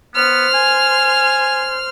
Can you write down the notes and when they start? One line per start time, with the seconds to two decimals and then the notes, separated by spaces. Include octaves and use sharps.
0.15 B3 C5 F6
0.54 G#5